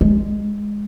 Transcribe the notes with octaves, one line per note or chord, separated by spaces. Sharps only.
G#3